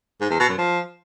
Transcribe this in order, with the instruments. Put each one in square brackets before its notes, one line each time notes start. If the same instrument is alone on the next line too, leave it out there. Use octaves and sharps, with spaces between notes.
[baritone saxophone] G#2
E2
B2
F#2
F3